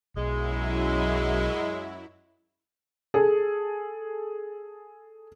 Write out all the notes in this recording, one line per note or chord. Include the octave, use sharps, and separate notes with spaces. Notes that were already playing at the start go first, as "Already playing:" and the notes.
B1 F#2 F#3 G#3 E4
G#4 A4